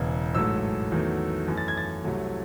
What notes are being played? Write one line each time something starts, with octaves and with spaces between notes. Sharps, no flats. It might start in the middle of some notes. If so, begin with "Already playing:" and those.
Already playing: E1 E2 C#3
A1 G#2 F#3 A3 E6
E2 D#3 F#3 A3
F#2 E3 A3
A6
G#6
A6
C2 C3 F#3 A3